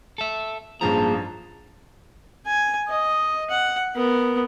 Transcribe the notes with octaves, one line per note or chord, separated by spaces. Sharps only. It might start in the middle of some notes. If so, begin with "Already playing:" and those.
A4 E5
A1 G2 F3 A#3 G#4 A5 A#5
G#5
D#5
F#5
B3 A#4